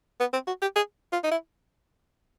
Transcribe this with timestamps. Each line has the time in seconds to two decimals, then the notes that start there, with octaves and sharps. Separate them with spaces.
0.20 B3
0.33 C4
0.47 F#4
0.62 G4
0.76 G#4
1.13 F4
1.24 D#4
1.32 E4